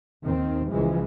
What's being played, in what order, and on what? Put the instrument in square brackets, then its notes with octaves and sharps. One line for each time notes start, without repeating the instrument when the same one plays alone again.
[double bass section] D#2 D#3 C4
C#2 E3 F3 G#3